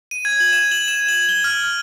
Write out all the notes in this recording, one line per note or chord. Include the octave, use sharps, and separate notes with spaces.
D#7
G#6
F#7
E7
F#7
E7
F#7
G7
F6